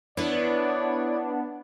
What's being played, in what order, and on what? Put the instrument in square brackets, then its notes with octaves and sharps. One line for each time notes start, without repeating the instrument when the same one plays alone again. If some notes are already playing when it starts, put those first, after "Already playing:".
[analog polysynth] B3 D4 [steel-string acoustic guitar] E4 B4 [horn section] C#5 D5